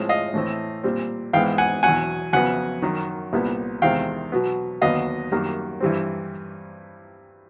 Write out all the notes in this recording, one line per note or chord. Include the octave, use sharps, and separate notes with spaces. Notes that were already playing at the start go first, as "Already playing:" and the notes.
Already playing: A2 F3 G#3 C4
D#5 F5
A2 E3 A3 C4
A#2 G3 C4
G#2 E3 G#3 B3 F5 G5
F#5 G#5
E2 B2 F#3 F#5 G#5
F2 C#3 F#3 B3 F#5 G#5
F#2 D#3 F#3
C2 A#2 G3 B3
E2 C3 D#3 G#3 C4 F5 G5
B2 F#3 B3
D#2 D3 F#3 B3 D#5 F5
F#2 D#3 G3 A#3
G2 E3 G3 C4